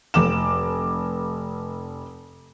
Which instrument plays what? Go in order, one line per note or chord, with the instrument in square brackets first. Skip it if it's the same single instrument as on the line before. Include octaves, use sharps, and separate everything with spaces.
[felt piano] F1 D6 E7